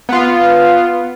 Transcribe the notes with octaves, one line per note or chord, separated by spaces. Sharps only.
B3 F4